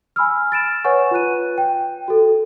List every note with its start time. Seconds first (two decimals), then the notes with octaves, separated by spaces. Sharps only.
0.16 G#5 B5 E6 F6
0.52 A6 D7 E7
0.84 B4 C#5 F#5 G#5 C#6
1.11 F4 B4 F#6 D#7
1.58 G5
2.08 F#4 A4